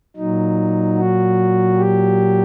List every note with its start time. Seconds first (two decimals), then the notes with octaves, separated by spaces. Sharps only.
0.17 A#2 F#3 D#4
0.97 F#4
1.77 G4